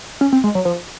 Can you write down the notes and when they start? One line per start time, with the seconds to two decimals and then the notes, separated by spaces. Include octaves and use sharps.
0.21 C#4
0.33 C4
0.44 G#3
0.55 F#3
0.65 F3